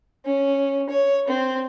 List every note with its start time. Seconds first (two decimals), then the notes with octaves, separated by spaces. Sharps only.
0.25 C#4
0.89 C#5
1.28 C4